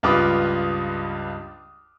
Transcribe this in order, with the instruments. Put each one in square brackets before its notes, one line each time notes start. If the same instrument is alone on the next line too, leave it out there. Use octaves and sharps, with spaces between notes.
[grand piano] C#2 G2 F4 B4 D6 D#6